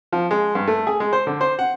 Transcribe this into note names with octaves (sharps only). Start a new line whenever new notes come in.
F3
G#3
G2
A3
G#4
G#3
C5
D3
C5
F#5